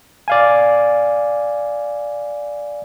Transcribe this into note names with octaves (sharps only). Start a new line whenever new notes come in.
D5 F5 G#5